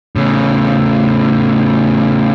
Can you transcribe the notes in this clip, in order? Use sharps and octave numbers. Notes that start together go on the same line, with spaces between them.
A2 C#3